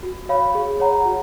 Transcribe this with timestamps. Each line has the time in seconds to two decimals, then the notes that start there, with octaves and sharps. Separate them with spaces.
0.03 F#4
0.29 C#5 F5 B5
0.55 G#4
0.80 C#5 F#5 A#5
1.05 F#4